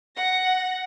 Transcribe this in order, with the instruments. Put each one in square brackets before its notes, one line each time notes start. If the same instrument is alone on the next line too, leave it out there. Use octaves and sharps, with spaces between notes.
[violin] F#5 A#6